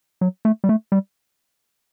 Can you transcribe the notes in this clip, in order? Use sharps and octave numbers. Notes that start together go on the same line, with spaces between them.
F#3
A3
G3
A3
G3